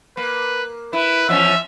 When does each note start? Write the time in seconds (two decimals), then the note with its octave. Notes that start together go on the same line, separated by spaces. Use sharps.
0.17 A#3 B4
0.93 E4 B4
1.29 E2 F3 C#4 E5